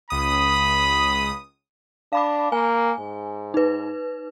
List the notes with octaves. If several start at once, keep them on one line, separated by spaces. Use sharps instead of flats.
C#2 B5 D#6
D4 F5 B5 D6
A#3 G#5
G#2
D#4 B4